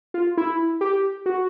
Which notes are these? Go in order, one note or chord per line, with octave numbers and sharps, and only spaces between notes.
F4
E4
G4
F#4